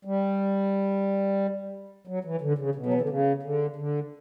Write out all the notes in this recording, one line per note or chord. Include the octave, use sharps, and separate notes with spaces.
G3
F#3
E3
D3
C#3
B2
F#3
E3
D3
C#3
D3
D3